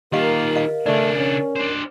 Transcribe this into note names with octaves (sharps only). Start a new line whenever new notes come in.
D#3 A#3 F4 G4 A#4 D#5 F5
D#5 F5
C#3 A3 D4 D5
C#4
D4 C5